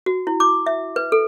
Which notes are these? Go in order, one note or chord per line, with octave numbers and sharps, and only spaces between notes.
F#4
E4
D6
E5
B4
A4